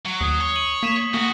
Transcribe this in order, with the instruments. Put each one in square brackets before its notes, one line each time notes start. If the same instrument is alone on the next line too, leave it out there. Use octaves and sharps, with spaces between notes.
[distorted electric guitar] F#3
[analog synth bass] D#2 [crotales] D#6 C7
[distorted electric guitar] C#5 [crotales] G7
[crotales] D#7 F#7
[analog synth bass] A#3 [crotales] B6 D#7 E7
[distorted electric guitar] G#2 F#4 [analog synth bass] A#3